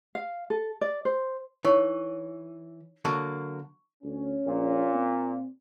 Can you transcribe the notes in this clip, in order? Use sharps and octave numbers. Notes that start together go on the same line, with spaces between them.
F5
A4
D5
C5
E3 D#4 C#5 C#6
D3 F#3 A#3 C#6
D2 C#4
A#1 A#2
C4